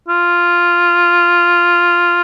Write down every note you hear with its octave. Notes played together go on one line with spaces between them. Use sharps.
F4